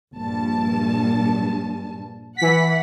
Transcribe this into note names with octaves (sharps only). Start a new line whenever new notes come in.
A#1 G2 A5
E3 F#5 B6